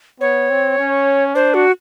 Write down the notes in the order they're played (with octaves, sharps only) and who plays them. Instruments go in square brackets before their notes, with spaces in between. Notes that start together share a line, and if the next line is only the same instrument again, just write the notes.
[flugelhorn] B3 [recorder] C#5
[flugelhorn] C4
C#4
[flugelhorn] D4 [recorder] C5
[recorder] F#4